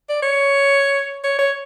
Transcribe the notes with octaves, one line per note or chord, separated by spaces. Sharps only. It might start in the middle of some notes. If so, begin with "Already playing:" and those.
D5
C#5
C#5
C#5